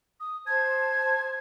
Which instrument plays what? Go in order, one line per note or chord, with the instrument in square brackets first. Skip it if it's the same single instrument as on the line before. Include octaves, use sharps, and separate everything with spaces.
[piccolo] D#6
[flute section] C5 A5 [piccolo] G#6